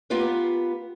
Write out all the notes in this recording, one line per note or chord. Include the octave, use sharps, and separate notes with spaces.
A#3 B3 F4 G4 B4